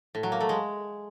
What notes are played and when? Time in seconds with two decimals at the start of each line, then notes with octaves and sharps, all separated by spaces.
0.15 A2
0.23 F#3
0.32 A#3
0.41 A3
0.49 G#3